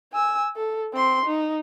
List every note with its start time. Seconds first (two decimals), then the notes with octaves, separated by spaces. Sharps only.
0.13 G#5 E6
0.56 A4
0.93 C4 C6
1.25 D#4